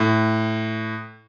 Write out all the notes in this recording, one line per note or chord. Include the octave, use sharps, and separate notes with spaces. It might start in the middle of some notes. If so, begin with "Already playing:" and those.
Already playing: A2